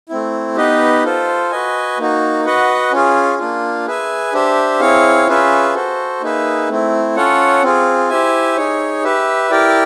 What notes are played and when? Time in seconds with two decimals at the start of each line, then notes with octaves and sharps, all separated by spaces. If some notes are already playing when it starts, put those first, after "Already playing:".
0.09 A3 C4 E4
0.57 B3 D#4 G4 B4 D#5
1.04 F4 A4 C5
1.51 F#4 B4 D#5 G#5
1.98 A#3 D#4 F#4
2.45 F#4 B4 D#5 F#5
2.92 C#4 F4 G#4
3.39 A#3 D4 F4
3.87 G#4 B4 E5 G#5
4.33 D4 G4 C5 E5
4.80 C4 E4 G#4 C#5 F5
5.27 C#4 F4 G#4 B4 E5
5.75 F#4 A4 C5
6.21 A#3 D#4 G#4 B4 E5
6.69 A3 C4 E4
7.16 C#4 F4 A4 C#5 F#5
7.63 C4 F4 G#4
8.10 E4 G4 C5 E5 G#5
8.57 D#4 G#4 C#5
9.04 G4 B4 E5
9.51 E4 G4 A#4 D5 G5